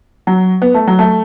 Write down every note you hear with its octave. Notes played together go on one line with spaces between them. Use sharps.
F#3
B3
A3
F#3
A3